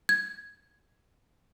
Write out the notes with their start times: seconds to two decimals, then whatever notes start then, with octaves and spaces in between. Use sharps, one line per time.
0.09 G#6